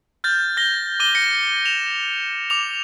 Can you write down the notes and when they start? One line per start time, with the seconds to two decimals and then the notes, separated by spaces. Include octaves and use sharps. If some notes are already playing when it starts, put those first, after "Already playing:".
0.24 F6 G6 A6
0.57 G6 A#6 G7
1.00 D6 D#7 G7
1.15 A#6 C#7
1.65 E7 F7
2.50 D6 F7